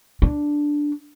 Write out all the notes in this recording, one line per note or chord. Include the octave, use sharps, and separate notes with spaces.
D4